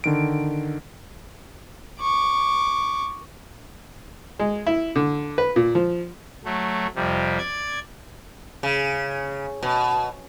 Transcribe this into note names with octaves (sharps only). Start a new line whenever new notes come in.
D3 D#3 D7
C#6 D6
G#3
E4
D3
B4
A#2
F3
F#3 A3
F2 C3 G3
D5 G#6
C#3
B2